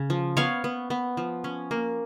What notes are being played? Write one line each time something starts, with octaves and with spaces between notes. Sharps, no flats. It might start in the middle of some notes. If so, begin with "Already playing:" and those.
Already playing: C#3
F3
B3 C#5 F5
B3
B3
F3
C#4
A#3